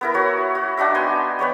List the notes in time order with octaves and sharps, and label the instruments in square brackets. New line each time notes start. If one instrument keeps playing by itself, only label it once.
[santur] B3 E4 A#4
F#4 C#5
F#4
D4 D#4 F#4 E5
B3 G5 G#5 C6
B3 B4 C#5 G5